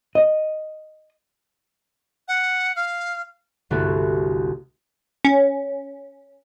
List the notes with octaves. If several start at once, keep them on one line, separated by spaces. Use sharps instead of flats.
D#5
F#5
F5
G1 C2 A3 B3 E4 F#4
C#4